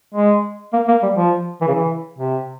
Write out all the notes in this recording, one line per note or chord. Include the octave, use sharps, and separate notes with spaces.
G#3
A#3
A#3
G3
F3
E3
C#3
E3
C3